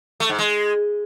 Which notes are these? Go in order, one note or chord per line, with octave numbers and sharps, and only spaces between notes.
A3
G#2
G#3